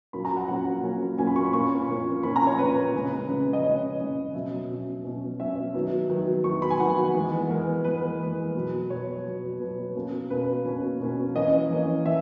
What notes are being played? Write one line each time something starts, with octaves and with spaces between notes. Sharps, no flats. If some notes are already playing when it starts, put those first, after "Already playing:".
A#2 F#3 A#3 C#4 B5
A#5
F#5
A#2 F#3 A#3 C#4 F#5
A#2 F#3 A#3 C#4
A#2 F#3 A#3 C#4 G#5
B5
C#6
B5
A#2 A#3 C#4 C#6
A#2 A#3 C#4
A#2 A#3 C#4 B5
A#5
C#5
A#2 A#3 C#4 B4
C#3 G#3 C#4
C#3 G#3 C#4 B4
D#5
C#3 G#3 C#4 C#5
C#3 G#3 C#4
B2 F#3 C#4 E5
B2 F#3 C#4
B2 F#3 C#4
B2 F#3 C#4 E5
D#3 F#3 B3
D#3 F#3 B3
D#3 F#3 B3 C#6
B5
G#5
D#3 F#3 B3 F#5
E3 G#3 B3
E3 G#3 B3 A#4
E3 G#3 B3 B4
E3 G#3 B3
B2 F#3 B3
B2 F#3 B3 C#5
B2 F#3 B3
B2 F#3 B3 B4
B2 A#3 C#4
B2 A#3 C#4 B4
B2 A#3 C#4
B2 A#3 C#4
E3 A#3 C#4 D#5
E3 A#3 C#4
E3 E5